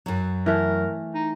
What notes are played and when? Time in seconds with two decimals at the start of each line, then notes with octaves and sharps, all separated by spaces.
0.06 F#2 F#3
0.46 E3 A3 A#4
1.14 D#4